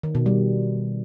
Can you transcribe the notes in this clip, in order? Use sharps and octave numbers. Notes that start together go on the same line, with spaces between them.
D#3
B2
G3